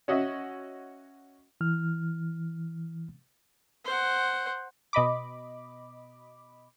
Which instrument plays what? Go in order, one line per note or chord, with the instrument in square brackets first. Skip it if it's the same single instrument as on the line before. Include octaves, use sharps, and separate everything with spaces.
[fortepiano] C#4 F#4 D#5 E5
[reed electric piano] E3 F6
[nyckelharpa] C5 F#5
[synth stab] B2 D#5 B5 D6